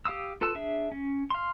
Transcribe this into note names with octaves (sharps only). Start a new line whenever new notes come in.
G4 F5 D#6 E6
F4 A4 B4 A5 E6
D4 G#4 E5
C#4
F5 C6